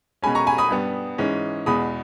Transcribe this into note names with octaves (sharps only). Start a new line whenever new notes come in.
B2 G#3 C#4 G#5 B5
A#5 C#6
G#5 B5
B5 D#6
G2 G3 B3
G#2 E3 G#3 C#4
E2 B2 G#3 B5 D#6